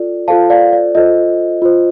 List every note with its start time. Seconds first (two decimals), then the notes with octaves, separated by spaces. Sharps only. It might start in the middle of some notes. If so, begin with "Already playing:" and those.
Already playing: F4 A4 D5
0.28 F4 A4 C5 F5 A5
0.50 D5 F5
0.73 D5
0.95 F4 A4 C5 D#5
1.62 F4 C5